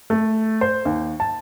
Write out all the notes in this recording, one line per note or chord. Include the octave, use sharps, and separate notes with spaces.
A3
C5
D#2
A5